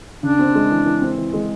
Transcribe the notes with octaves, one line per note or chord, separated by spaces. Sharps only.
C#3 D4
C4
G#3
E3
E3
C4
E3
G#3